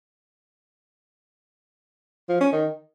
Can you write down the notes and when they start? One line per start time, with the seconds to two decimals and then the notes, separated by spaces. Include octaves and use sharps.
2.29 F3
2.41 C#4
2.52 D#3